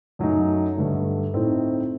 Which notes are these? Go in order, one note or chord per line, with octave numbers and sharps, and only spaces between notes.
F#2 F#3 A3 D#4
G2 D3 A3
A2 A3 C4 D#4